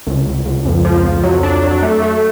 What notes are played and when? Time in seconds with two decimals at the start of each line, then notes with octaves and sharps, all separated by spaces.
0.07 C#2
0.26 C#2
0.45 C#2
0.65 F2
0.85 F3
1.04 F2
1.23 F#3
1.43 D4
1.63 F#3
1.83 A3
2.02 A3